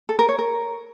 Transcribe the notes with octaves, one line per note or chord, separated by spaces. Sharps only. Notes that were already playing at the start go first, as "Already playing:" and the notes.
A4
A#4
C#5
A#4